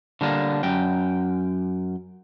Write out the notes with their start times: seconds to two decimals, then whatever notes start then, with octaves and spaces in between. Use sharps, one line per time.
0.21 D3 G3 A#3 D4
0.63 F#2 G5